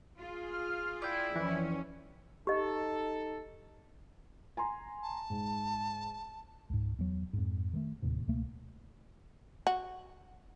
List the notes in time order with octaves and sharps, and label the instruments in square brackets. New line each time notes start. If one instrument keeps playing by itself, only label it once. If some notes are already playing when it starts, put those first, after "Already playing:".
[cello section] F4 G#4
[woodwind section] F6
[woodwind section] E4 [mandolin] D5 G5
[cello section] F2 C#4 [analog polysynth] E3
[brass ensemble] D#4 A4 [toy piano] G4 D#5
[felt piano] G#5 A#5 C6
[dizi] A5
[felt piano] G#2
[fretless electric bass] C#2 G#2
E2 F#3
F2 G#2
D#3 E3 A3
D1 D#2 A2 C3
C#2 B2 A3 A#3
[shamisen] F#4